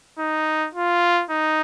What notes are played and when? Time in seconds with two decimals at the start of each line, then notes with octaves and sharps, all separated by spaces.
0.19 D#4
0.74 F4
1.30 D#4